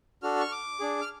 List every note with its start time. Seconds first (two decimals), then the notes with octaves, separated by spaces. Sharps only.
0.22 D4 F#4 A4 F6
0.40 C#6
0.52 D6
0.80 D4 G#4
1.01 F6